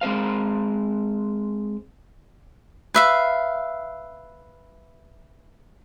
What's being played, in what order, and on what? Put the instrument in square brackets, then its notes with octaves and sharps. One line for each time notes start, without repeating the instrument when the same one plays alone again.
[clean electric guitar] G#3 C4 C5 F5
[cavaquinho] B4 E5 F5